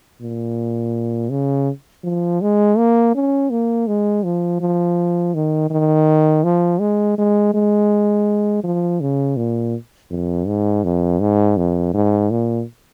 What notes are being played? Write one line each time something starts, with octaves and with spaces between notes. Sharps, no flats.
A#2
C#3
F3
G#3
A#3
C#4
A#3
G#3
F3
F3
D#3
D#3
F3
G#3
G#3
G#3
F3
C#3
A#2
F2
G#2
F2
G#2
F2
G#2
A#2